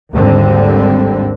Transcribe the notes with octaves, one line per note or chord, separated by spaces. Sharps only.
G#1 D#2 D3 G3 C4